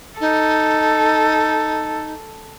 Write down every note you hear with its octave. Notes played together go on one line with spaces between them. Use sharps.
D#4 A4